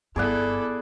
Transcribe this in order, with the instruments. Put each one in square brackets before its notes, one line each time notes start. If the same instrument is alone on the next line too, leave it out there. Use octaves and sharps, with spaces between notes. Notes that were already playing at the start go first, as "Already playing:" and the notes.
[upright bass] G1 G2 [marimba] B3 [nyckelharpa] E4 A4 [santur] G#4 D5 F#5